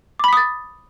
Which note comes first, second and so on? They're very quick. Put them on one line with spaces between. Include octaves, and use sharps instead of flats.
D6 B5 B6 D#6 A6